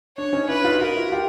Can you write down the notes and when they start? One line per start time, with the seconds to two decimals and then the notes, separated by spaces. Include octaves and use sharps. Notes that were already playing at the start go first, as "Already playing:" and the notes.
0.17 D4 C#5
0.33 C#4 D#4
0.49 D4 E4 B4
0.64 D#4 F4
0.74 F#4
0.81 D#4 F4 A#4
0.96 E4 F#4
1.12 F4 G4